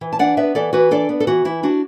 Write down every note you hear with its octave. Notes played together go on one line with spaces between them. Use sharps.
E3
A5
D4 D5 F#5
B3 B4 E5
E3 A4 D5
E3 F#4 B4
D4 A4 D5
B3
A4
E3 F#4
E3 E4
D4 F#4